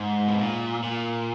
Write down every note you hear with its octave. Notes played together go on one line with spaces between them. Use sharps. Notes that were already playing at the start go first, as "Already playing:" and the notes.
Already playing: G#2
B2
A#2
A#2